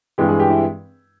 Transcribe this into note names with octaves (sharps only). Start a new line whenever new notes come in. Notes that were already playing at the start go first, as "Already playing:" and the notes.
G2 E3 G#3 G4
G#4
G4
E4